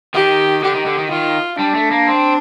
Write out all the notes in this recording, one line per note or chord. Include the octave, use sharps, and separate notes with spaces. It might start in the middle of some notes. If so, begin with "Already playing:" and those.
D#3 G4
D3 G4
D#3
D3
D#3
D#3 F4
G3 D4
A3
A#3
C4